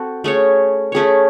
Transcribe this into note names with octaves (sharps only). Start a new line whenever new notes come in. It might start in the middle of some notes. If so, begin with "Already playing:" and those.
Already playing: C4 F#4 A4
A3 C#4 G#4 C#5
A3 C#4 G#4 C#5